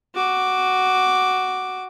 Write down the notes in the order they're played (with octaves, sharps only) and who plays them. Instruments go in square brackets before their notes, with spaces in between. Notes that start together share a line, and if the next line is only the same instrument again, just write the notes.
[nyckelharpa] F#4 D6